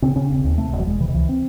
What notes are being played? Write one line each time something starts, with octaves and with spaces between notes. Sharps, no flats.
C#3 C4
C#3 C#4
E1 C4
D#2
C3 A3
E1
F#3
E1 G#3
C3 E3
D#3
C#2 E3
C4